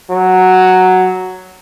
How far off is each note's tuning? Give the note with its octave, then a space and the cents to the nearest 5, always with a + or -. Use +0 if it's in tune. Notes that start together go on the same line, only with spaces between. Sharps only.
F#3 +0